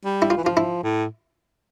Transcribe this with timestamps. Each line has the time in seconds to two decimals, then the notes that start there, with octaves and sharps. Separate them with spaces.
0.05 G3
0.22 E4
0.30 F4
0.37 E3
0.44 F3 F4
0.57 E4
0.83 A2